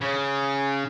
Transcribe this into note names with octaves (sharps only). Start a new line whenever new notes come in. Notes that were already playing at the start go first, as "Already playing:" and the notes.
C#3